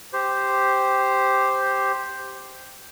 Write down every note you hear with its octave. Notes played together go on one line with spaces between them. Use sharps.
G4 C5